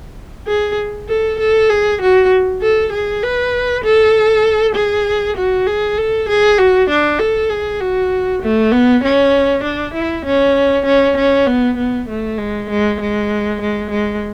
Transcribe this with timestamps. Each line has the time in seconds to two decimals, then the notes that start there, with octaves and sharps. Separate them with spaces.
0.47 G#4
1.08 A4
1.39 A4
1.70 G#4
2.01 F#4
2.62 A4
2.92 G#4
3.23 B4
3.84 A4
4.75 G#4
5.37 F#4
5.67 G#4
5.98 A4
6.29 G#4
6.58 F#4
6.89 D4
7.19 A4
7.50 G#4
7.80 F#4
8.42 A3
8.72 B3
9.03 C#4
9.63 D4
9.94 E4
10.25 C#4
10.85 C#4
11.17 C#4
11.47 B3
11.77 B3
12.09 A3
12.38 G#3
12.70 G#3
13.00 G#3
13.61 G#3
13.91 G#3